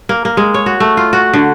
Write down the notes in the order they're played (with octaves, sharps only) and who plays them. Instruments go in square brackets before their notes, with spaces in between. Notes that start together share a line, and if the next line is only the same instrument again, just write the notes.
[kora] A#3
A#3
G#3
C#5
F#4
A3
F4
F#4
D3